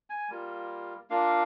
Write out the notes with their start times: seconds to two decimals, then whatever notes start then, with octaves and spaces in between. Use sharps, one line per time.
0.10 G#5
0.30 G3 A#3 F4
1.10 A#3 D4 F4 F5